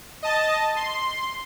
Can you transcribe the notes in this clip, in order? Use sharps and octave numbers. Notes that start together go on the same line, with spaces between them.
D#5 A5
C6